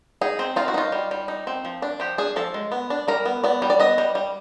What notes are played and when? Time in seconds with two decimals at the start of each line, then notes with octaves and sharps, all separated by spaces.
0.21 D#4 G#4
0.39 C4
0.56 D#4 F4
0.68 F#4
0.74 D#4 F4
0.92 G3
1.11 G3
1.28 D#4
1.47 C4
1.65 F3
1.82 D4
2.00 F3 G4
2.18 D4 G#4
2.36 F3 A4
2.54 G#3
2.72 B3
2.90 D4
3.08 G3 A#4
3.25 B3
3.43 B3 D5
3.62 G3
3.70 D5
3.80 B3 D#5
3.98 G3
4.15 G3